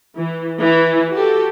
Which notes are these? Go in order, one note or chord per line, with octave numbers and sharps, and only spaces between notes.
E3
E3 E4
F#4 G4 A4